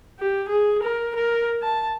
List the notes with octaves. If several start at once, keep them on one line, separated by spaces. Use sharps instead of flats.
G4
G#4
A#4
A#4
A5